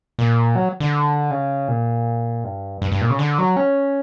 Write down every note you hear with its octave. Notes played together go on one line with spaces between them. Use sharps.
A#2
F#3
D3
C#3
A#2
G2
G2
G2
A#2
C#3
D3
F#3
C#4